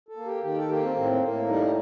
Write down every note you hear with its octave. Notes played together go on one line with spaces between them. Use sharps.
A4
A#3
G4
D#3 G4
A4
A#3 G4
C4
A2 C4
A2 A#3
G3 D#4